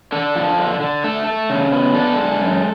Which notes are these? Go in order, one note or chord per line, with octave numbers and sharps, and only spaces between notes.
D4 A4
F3
D3
D3
A3 A4
A3
C#3
B3
D4 A4
G#3
F#2